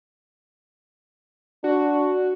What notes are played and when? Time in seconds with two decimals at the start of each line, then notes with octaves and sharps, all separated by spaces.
1.64 D4 F#4